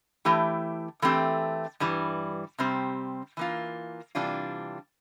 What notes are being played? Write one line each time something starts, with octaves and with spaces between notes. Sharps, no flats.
E3 A3 E4 G4
E3 A3 C4 G4
G2 E3 G3
C3 G3 C4 G4
E3 A#3 F4
C3 E3 G3 D4 F4